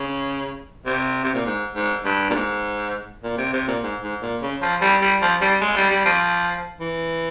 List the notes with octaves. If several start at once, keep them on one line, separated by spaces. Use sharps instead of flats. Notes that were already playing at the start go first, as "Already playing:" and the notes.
Already playing: C#3
C3
C3
A#2
G#2
G#2
G2
A#2
G#2
A#2
C3
C3
A#2
G#2
G#2
A#2
C#3
F3
G3
G3
F3
G3
G#3
G3
G3
F3
E3